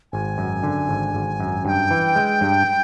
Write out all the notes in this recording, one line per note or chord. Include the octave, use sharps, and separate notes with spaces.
G#1 G#5
F#2
D3
G#1
G#1
F#2
G2 G5 G#5
E3
G#3
G2